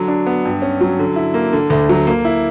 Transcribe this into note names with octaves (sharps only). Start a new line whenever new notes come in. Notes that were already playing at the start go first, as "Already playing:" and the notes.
Already playing: D3 F#3
D4
B3
G2
C#4
F#3
D3
E4
A#3
D3
D2
F#3
A#3
E4